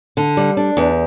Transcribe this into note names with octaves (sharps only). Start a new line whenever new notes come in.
D3
G3
D4
E2